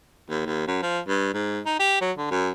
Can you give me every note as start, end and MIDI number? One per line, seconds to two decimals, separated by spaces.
0.30 0.42 39
0.46 0.65 39
0.68 0.80 42
0.82 0.99 53
1.08 1.31 43
1.34 1.60 44
1.66 1.79 63
1.80 1.96 67
2.01 2.12 54
2.18 2.31 50
2.31 2.51 42